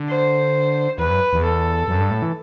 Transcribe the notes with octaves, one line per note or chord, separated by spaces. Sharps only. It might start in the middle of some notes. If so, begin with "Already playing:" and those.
Already playing: D3
C5
E2 B4
F#2
E2
A4
F#2
G2
A2
E3